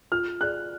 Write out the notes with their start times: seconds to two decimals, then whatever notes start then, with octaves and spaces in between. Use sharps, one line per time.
0.12 F4 F6
0.41 G#4 D5 F#6